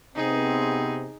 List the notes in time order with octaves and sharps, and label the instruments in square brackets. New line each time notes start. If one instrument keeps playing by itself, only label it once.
[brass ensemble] C3 B3 C4 [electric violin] D#4 G#4